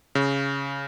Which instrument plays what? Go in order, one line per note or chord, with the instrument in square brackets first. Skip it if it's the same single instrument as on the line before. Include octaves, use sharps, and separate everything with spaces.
[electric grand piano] C#3